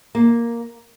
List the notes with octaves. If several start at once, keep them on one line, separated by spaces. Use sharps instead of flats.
A#3